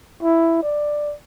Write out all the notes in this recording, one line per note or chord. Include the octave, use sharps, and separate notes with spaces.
E4
D5